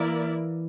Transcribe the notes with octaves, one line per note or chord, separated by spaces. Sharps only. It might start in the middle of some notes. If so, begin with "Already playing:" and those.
Already playing: E3 A#3 E4 A#4 D5